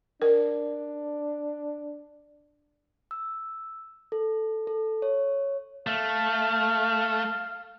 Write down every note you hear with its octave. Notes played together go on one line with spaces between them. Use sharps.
D4 A#4
E6
A4
A4
C#5
A3 F5